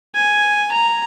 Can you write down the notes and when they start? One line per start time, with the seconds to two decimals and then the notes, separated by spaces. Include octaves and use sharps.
0.15 G#5
0.72 A#5